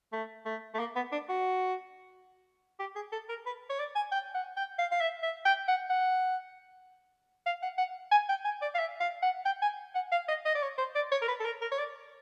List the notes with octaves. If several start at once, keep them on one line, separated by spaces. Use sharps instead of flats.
A3
A3
A3
A#3
B3
D4
F#4
G4
G#4
A4
A#4
B4
C#5
D5
G#5
G5
F#5
G5
F5
F5
E5
E5
G5
F#5
F#5
F5
F#5
F#5
G#5
G5
G#5
D5
F5
E5
F5
F#5
G5
G#5
F#5
F5
D#5
D#5
D5
C#5
C5
D5
C#5
A#4
B4
A4
A#4
A#4
C#5
D5